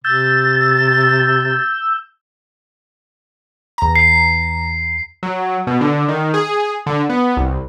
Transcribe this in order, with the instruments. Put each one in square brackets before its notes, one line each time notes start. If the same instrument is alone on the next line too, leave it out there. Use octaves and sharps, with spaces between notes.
[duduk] C3 [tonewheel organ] E6 G6 [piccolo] A6
[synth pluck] E2 A#5
[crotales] C7
[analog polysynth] F#3
B2
D3
D#3
G#4
D3
B3
C2